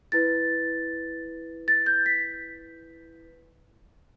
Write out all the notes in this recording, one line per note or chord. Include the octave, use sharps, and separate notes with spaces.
E4 B4 A6
A6
G6
B6